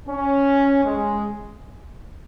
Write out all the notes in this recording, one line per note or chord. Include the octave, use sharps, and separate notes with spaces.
C#4
G#3